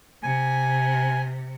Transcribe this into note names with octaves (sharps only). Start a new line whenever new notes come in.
C3 G#5